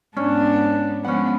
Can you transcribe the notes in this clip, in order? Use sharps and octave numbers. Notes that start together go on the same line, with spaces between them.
G#2 B3 C#4 D4
F3 G#3 B3 C#4 F#5